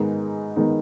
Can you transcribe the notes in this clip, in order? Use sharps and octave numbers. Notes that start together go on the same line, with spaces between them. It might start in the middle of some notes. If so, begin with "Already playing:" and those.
Already playing: G#2 D#3 G#3 B3 D#4
D#3 G#3 B3 D#4